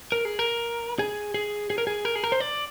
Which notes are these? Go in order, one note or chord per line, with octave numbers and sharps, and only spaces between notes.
A#4
G#4
A#4
G#4
G#4
G#4
A#4
G#4
A#4
G#4
A#4
C5
D5